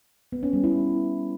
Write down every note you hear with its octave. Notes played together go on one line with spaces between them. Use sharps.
B3
C#4
G3
E4